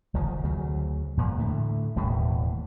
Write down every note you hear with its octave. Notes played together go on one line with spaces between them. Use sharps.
F1 D2 D#3 F3
D2 C#3 F#3
E2 A#2 F3
A2 D3 A3
E1 D#2 A2 G3